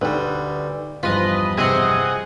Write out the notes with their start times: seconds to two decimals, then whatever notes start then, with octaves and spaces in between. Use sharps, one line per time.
0.02 D2 G3 D#4 B4
1.03 E2 G2 F3 F4 B4 D#5
1.58 C3 C4 G#4 D#5 F#5